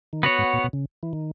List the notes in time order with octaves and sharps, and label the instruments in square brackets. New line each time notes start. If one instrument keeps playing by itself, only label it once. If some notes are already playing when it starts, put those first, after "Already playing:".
[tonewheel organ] D#3
[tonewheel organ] C#3 [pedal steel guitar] B3 F#4 C#5
[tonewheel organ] G#2
A#2
B2
C#3
E3
D#3